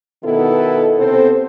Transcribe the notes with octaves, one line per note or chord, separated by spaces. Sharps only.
B2 D#3 B3 E4 A4
C3 B3 C4 A4 C5